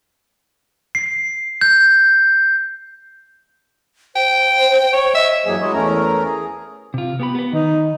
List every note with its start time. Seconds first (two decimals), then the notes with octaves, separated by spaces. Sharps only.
0.95 C7
1.61 G6
4.16 C5 G5
4.93 C#5
5.15 D#5 E5
5.46 G2 E3 F#3 A#3 G#4 G#5
5.61 F#3 G#3 E4 C#5 D#5
5.73 E2 A3 C#4 A#4 A#5
6.23 G#4
6.94 C3 F4
7.20 B3 G4 B5
7.35 B3 B4
7.53 D#3 D#4